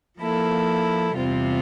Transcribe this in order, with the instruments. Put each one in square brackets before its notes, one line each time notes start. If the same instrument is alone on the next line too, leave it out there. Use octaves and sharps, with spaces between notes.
[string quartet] F3 A#3 E4 A4
E2 C3 G3 C4 F4